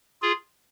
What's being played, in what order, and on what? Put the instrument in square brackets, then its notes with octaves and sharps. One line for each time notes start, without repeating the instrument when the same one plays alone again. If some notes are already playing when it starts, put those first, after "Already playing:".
[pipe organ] F4 G#4